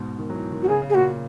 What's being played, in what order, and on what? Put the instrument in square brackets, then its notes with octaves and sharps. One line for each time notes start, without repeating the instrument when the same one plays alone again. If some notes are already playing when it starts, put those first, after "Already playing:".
Already playing: [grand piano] G#2 B2
D#3
F#3
E3
D#3
[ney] F#4
[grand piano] C#3 [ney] G#4
[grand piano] C#3
[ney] G#4
[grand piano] A#2 [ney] F#4